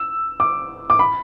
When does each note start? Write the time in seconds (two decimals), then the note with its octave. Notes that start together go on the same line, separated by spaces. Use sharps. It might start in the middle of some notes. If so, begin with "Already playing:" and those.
Already playing: E6
0.40 D6
0.90 D6
0.99 B5